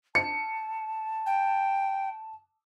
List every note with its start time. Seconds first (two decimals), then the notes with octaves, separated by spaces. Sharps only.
0.15 A5 C#7
1.26 G5